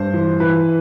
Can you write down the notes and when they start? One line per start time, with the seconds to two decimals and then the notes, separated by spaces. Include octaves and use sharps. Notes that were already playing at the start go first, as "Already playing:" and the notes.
Already playing: G2 C5
0.14 E3
0.40 E3 B4